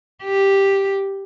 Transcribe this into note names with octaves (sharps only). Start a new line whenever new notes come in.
G4